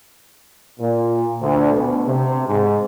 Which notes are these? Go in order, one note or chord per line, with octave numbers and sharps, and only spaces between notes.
A#2
D2
B2
C3
G#2